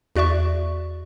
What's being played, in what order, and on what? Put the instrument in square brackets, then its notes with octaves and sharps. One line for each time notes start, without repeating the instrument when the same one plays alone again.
[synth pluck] E2 F#4 D5 E5 C#6